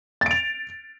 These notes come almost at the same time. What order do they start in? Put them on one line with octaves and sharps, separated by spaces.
A6 D7 F7